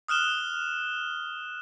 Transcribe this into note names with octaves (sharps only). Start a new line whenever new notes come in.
D#6 F6 F#6 E7 G7